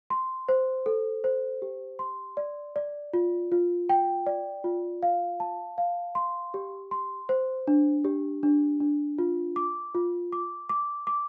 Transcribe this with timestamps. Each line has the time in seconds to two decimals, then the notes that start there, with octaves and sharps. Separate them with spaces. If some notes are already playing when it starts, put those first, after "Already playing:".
0.10 C6
0.49 C5
0.86 A4
1.24 C5
1.62 G4
1.99 C6
2.37 D5
2.76 D5
3.13 F4
3.52 F4
3.89 G5
4.26 D5
4.64 F4
5.03 F5
5.40 A5
5.78 F5
6.15 C6
6.54 G4
6.91 C6
7.29 C5
7.67 D4
8.04 G4
8.43 D4
8.80 D4
9.18 F4
9.56 D6
9.95 F4
10.32 D6
10.69 D6
11.07 D6